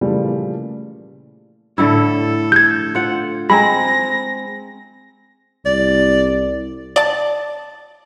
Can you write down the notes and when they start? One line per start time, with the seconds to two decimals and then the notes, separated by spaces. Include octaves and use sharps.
0.01 A#2 C#3 E3 F3 G3 A3
1.78 A2 D3 E4 A4
2.52 G6 G#6
2.95 F4 F#5
3.50 G#3 C4 A#5 B5 A#6
5.65 C2 D5
6.96 D5 A5